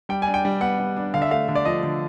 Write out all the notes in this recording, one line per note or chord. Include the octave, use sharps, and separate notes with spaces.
G3 G5
G#5
D4
G5
G3
B3 F#5
G3
D4
D3 F5
E5
A3 F5
D3
D5
F3 D#5
D3